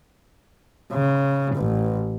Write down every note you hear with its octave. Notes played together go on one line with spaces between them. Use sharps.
C#3
A1